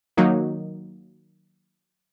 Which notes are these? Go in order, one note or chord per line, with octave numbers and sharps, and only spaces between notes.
D#3 F#3 A#3 D#4